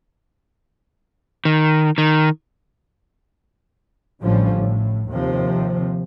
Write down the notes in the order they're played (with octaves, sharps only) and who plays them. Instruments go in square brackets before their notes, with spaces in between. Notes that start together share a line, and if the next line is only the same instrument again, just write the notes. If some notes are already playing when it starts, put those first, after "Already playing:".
[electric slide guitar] D#3
D#3
[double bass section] A1 A2 D3 F3 G3 C#4
A2
D#2 C3 F3